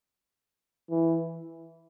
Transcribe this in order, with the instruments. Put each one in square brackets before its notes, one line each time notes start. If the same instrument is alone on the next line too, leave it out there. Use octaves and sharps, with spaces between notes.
[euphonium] E3